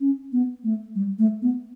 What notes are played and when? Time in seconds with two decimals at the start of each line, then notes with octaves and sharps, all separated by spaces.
0.01 C#4
0.33 B3
0.64 A3
0.95 G3
1.19 A3
1.42 B3